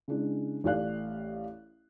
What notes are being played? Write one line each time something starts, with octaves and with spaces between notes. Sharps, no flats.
C#3 G#3 D4 E4
A1 A3 G4 D5 F5 F#6